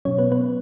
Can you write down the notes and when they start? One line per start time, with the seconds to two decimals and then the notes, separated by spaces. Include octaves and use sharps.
0.05 B2 F#3 C#4 C#5
0.18 B3 B4
0.32 B3 B4